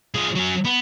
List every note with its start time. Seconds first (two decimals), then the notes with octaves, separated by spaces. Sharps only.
0.14 F3 G#4
0.35 F#3 C#4
0.65 B3